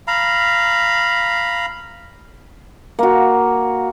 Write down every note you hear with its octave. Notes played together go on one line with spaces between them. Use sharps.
F5 A#5 B5
A#3 F#4